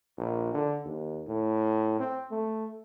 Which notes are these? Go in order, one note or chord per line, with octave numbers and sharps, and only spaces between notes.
A#1
D3
D#2
A2
C4
A3